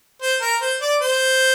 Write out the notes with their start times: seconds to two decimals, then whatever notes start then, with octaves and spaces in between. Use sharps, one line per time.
0.22 C5
0.41 A#4
0.61 C5
0.81 D5
1.01 C5